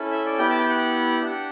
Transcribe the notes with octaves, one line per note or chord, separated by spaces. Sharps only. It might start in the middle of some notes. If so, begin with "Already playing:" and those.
Already playing: C#4 E4 A4
E5
D5
B3 E4 G4 G5
A5
G5
F#5
D4 G4